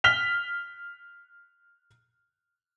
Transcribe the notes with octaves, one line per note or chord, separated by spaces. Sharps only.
F6 B6 F7 G7